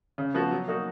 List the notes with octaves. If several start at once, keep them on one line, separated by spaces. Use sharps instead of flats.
C#3
F3 B3 F#4
F#3
A#3 D#4 F#4